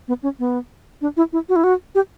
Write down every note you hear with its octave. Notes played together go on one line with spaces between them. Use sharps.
B3
C#4
B3
D4
E4
E4
F#4
E4
F#4
G4